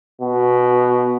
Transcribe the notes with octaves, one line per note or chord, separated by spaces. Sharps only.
B2